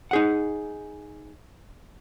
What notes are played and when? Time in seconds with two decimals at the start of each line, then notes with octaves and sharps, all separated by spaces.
0.11 D#4 G#4 F#5